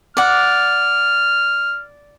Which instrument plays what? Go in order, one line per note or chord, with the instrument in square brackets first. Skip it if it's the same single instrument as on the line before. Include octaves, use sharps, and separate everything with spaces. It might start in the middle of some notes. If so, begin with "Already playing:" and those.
[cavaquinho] D5 F#5 [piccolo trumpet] F6